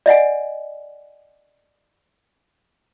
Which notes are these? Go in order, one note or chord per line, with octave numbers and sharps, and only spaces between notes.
D5 D#5 F#5 G#5